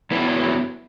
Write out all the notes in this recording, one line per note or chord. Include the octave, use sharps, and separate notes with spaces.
F#2 F#3 B3 E4 B4